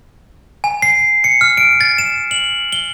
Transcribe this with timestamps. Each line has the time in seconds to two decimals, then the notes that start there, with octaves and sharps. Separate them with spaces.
0.64 G#5
0.82 C7
1.24 C#7
1.41 F6
1.57 D7
1.81 A6
1.98 E7
2.31 F#7
2.72 G7